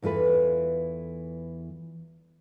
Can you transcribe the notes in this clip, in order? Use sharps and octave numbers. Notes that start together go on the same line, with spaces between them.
E2 E3 F4 A4 B4